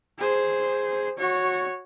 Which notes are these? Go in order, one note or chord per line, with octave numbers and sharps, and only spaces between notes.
G#4 C5
F#4 C#5